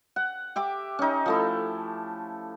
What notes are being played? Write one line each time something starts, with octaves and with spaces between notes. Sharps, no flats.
F#5
G4 E5 D6
C#4 D#4
F3 A3 E4